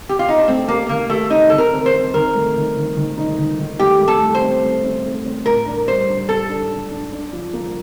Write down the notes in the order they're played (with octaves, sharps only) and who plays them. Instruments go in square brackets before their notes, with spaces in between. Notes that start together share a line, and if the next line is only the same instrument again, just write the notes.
[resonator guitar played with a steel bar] G4
F4
D#4
D4
[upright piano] A3 [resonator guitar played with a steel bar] C4
[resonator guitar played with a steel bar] A#3 [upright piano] G4
[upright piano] D#3 [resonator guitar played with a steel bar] A#3
[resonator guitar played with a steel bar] A3 [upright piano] G4
[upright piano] C4 [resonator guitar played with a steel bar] D#4
[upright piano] D#3 [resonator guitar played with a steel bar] A4
[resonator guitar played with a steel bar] A#4
[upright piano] C4
[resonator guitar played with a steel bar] C5
[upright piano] C4
[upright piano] D#3 [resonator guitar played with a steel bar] A#4
[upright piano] A3
D#3
D#3
D#3
D#4
D#3
D#3
[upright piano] A3 [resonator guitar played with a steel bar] G4
[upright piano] A3
[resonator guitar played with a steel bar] A4
[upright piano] A3
[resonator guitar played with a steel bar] C5
[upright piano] C4
A3
C4
A3
C4
[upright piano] A2 [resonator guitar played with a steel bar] A#4
[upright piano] D4
[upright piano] G3 [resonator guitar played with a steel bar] C5
[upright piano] D4
[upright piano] G4 [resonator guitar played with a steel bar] A4
[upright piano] D4
D4
D4
D4
F3
A#3